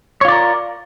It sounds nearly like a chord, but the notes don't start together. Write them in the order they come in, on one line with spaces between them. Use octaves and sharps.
C#5 F4 D5 A#4